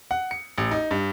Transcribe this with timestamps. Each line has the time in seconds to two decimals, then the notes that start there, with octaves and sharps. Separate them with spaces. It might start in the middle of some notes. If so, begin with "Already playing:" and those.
0.11 F#5
0.31 C#7
0.58 A1
0.71 D#4
0.91 G2